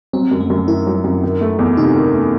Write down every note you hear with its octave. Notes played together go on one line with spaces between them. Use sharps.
F#3 C4
F#2
A3
F#2
D#3 E4
F#3
F#2
D#3
A3
E2
C3 D#4
D#3
A3